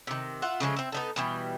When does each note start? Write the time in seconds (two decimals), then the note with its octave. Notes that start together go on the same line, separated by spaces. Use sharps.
0.07 C3 D#3
0.42 F4 E5 F#5
0.60 C#3 F3 G#3 A3
0.76 C4 E4
0.92 B3 D#4 A4
1.16 B2 E3 G3